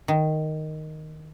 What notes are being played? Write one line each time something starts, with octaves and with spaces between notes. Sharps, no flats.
D#3